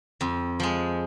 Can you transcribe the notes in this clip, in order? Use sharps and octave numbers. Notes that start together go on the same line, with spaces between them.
F2
F3 G#3